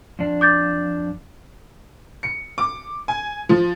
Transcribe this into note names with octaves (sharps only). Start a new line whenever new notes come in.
F2 D4
D6 G6 A6
C#7
D6
G#5
F3